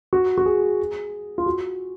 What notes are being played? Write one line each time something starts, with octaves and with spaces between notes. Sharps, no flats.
F#4
F#4
G#4
F4
F#4